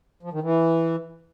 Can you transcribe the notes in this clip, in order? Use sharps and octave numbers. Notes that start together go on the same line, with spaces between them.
F3
D#3
E3